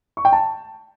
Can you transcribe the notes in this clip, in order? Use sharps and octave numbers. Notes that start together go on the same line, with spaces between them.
C#6
G5
A5